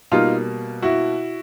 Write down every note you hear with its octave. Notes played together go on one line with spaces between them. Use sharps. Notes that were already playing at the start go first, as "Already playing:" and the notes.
B2 G3 A#3 D#4 F4
E4 F#4